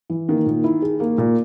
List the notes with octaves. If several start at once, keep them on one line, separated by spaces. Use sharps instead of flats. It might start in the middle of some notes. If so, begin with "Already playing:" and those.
E3
D#3 A#3
A#2
E4
G#4
A#3
A#2